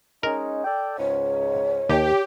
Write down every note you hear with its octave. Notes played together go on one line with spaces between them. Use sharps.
G#3 C#4 D#4 A#4
A4 D5 G5
C#2 G#2 C#5
D#2 G4